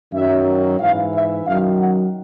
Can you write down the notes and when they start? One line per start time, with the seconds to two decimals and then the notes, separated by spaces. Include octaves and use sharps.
0.13 F#2 D#3 F#3 E5
0.79 G#2 E3 F5
1.13 E5
1.46 F#2 D#3 F#3 F5
1.79 F#5